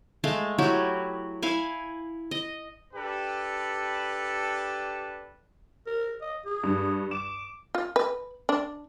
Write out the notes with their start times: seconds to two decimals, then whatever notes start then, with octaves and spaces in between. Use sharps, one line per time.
0.24 G#3 A3 F5 A5
0.58 F#3 E4 F#4 G4
1.42 E4 F5 G#5
2.31 D#5
2.94 D4 G4 A4 B4
5.87 A#4
6.22 D#5
6.45 G#4
6.63 G2
7.11 D6 E7
7.75 F4
7.96 B4
8.49 D4